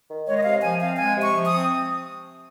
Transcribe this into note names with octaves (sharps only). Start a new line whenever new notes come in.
D#3
G#3 C#5
D#5
C3 F5
F3 G#5
C4 F5
G#3 G#5
C3
C#6
F3
D#6
C4